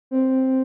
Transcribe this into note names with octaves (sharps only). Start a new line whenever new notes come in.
C4